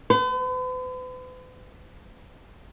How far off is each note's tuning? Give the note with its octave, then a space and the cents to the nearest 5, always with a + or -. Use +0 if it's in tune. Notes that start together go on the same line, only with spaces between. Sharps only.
B4 +45